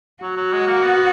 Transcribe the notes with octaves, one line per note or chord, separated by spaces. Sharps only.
F#3 F#4
F#3
G#3
A#3
B3